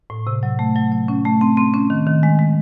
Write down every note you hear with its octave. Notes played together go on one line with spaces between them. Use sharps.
A2
C3
F#3
A3
F#3
F#3
C#4
A3
C4
C4
C#4
D#3
D#3
G#3
G#3